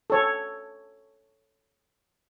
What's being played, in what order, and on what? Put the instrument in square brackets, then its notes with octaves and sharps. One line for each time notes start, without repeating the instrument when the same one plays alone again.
[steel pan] A4 C#5